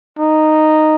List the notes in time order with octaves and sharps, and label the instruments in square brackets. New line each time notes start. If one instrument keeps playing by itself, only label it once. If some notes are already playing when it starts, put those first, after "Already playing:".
[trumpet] D#4